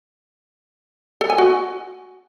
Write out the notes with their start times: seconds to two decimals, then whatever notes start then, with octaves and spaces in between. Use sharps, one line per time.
1.21 A4
1.30 G#5
1.38 F#4